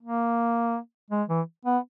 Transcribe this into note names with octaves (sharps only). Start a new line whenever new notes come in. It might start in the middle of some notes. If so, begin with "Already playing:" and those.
A#3
G#3
E3
B3